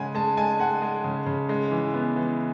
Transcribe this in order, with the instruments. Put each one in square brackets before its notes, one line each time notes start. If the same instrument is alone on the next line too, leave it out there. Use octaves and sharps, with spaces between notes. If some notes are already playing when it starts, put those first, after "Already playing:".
Already playing: [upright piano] C#3 G#3 F#5 G#5
G#3 A5
G#3 G#5
G#3 F#5
G#3
C#3
C#3
G#3
E3
B3
E3